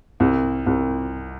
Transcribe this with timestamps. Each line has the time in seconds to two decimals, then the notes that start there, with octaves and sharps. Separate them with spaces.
0.20 C2
0.66 C2